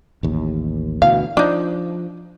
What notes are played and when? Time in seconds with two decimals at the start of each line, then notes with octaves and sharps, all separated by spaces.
0.23 A1 D#2
1.02 D2 B2 E3 F5
1.37 F3 D4 D#4